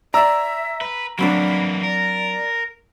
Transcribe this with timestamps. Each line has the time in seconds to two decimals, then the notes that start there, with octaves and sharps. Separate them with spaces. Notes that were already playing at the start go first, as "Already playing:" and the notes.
0.14 D5 E5 A#5 E6
0.81 B4
1.19 E3 F#3 A#3 C4 D4 B5
1.83 A#4 D5